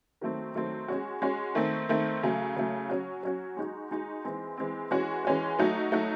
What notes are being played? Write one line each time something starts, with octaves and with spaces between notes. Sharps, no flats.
D#3 F#3 A3 C4
D#3 F#3 A3 C4
G#3 C#4 F#4
G#3 C#4 F#4
D#3 A3 C4
D#3 A3 C4
C#3 F#3 A3
C#3 F#3 A3
F#3 C#4 F#4
F#3 C#4 F#4
G#3 D#4 F#4
G#3 D#4 F#4
E3 G#3 C4
E3 G#3 C4
E3 G#3 C#4 F#4
E3 G#3 C#4 F#4
F#3 A3 D#4 F#4
F#3 A3 D#4 F#4